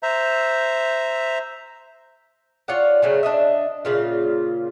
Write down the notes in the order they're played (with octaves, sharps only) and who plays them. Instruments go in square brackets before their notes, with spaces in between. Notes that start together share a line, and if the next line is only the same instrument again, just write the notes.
[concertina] C5 E5 A#5
[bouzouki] F4 C#5 D5 F#5
C#3 F#3 A3
D4 D#5 E5
A#2 C#3 F4